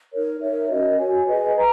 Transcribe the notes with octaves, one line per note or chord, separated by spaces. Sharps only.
D#4 A#4 C#5
D#4 A#4 C#5 E5
C#4 F#4 A#4 D#5
F#4 C#5 G#5
G#4 B4 D#5 G#5
B4 D#5 A#5